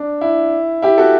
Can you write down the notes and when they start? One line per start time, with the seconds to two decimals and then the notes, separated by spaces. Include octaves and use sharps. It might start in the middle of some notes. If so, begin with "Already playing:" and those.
Already playing: D4
0.21 E4
0.82 E4 G4
0.98 F#4 A4